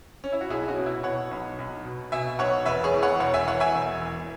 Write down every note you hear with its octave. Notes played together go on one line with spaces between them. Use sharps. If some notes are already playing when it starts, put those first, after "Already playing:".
C#4
E4
F#4
B1 E4 G#4
C#4 F#4
B2
E4
B2 C#5 F#5
B1
B1
B2
B2 E5 G#5
B1 C#5 F#5
E1 B4 E5
G#4 C#5
E2
C#5 F#5
E1 C#5 F#5
E5 G#5
E3 C#5 F#5
E5 G#5
E1
E2